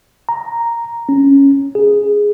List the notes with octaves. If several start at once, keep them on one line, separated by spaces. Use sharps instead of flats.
A#5
C#4
G#4